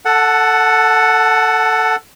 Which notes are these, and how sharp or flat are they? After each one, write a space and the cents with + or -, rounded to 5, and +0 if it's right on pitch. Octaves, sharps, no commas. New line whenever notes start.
A4 +10 F#5 +0 A5 -20